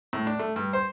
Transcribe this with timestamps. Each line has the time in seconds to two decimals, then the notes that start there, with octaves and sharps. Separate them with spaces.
0.13 A2
0.27 D4
0.39 A3
0.56 G2
0.73 C5